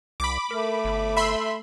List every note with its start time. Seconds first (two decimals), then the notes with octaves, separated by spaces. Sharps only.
0.20 C2 B5 D6
0.51 A3 A#4
0.85 G1
1.17 E5 B5 C6